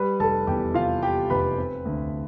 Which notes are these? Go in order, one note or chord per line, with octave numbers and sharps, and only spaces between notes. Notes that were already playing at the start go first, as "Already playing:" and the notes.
Already playing: G3 B4 B5
F1 A4 A5
E2 G4 G5
C3 F4 F5
G3 G4 G5
F1 B4 B5
C4
D2